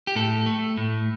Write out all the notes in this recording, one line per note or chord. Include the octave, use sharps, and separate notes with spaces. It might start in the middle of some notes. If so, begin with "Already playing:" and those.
G4
A2 A4
A3
A2